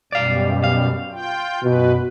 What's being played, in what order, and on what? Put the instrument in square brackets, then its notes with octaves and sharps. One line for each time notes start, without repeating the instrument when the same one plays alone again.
[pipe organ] F#2 B2 G3 [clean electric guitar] D5 F5
[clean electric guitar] F5
[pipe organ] F4 G5
[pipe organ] F#2 B4 [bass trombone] B2